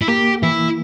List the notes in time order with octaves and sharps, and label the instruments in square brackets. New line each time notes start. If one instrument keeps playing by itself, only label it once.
[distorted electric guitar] E4
[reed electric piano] A#3 [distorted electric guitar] G4
[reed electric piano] E3 [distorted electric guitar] E4